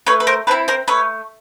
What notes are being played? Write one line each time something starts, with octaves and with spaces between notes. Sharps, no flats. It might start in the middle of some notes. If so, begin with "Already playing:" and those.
A3 B4 C#5
B4
A#4 C5
C4 E4 A4 B4
A#4 C5
A3 B4 C#5